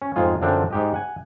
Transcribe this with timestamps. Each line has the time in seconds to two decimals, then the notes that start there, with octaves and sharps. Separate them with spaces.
0.02 C#4
0.16 F2 G#2 F4 G#4
0.41 F#2 D3 F3 C4 D4 G5
0.71 G#2 G4 D#5
0.94 F#5 G#5